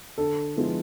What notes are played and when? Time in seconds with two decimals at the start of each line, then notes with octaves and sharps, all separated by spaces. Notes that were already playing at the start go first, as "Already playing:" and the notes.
0.18 D3 A4
0.56 F3 G#3 B3 E4